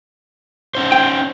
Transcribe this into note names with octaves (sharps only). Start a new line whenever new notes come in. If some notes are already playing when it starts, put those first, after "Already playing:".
C#4 D#4 C5
G5